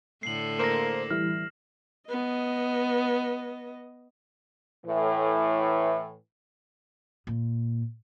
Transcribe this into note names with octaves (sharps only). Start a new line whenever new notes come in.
A2 D3 A4 C7 F#7
A#3 C5 A#6 E7
E3 G3 E4 F6
B3 D#5
A2 E3
A#2